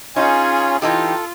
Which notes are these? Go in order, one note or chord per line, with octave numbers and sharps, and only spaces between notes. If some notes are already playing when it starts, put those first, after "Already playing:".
C#4 D#4 F4 G#4 C#5
E3 D#4 F4 G4 A4